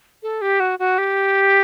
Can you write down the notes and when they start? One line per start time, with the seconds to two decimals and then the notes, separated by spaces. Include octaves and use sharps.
0.23 A4
0.41 G4
0.60 F#4
0.79 F#4
0.98 G4